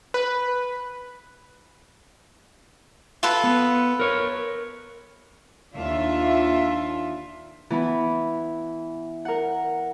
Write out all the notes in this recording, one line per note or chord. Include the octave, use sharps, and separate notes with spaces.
B4
F4 A4 B4
B3
A#4 C#5
D#2 D4 F4 E5
E3 B3 B5
A#4 F#5